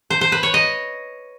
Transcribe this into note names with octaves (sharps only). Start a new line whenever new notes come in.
C5
C5
B4
C#5
D#5